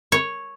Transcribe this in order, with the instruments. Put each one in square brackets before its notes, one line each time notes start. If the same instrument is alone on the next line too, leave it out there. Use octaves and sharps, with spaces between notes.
[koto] C#5